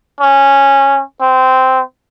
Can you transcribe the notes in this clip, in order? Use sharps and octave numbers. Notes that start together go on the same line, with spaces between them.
C#4
C4